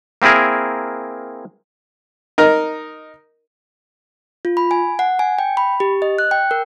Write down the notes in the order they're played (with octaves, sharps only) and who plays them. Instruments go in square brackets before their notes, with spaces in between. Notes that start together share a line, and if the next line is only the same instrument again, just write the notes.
[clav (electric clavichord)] A#3 C4 E4 G#4 A#4
[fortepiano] D#4 A#4
[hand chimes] F4
B5
G#5
F#5
G#5
G5
B5
G4
D#5
F#6
G5
A#4